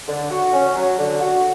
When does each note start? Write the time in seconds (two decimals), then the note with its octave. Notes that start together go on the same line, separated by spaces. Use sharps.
0.08 D3
0.31 F#4
0.53 C#4
0.75 F#3
0.98 D3
1.21 F#4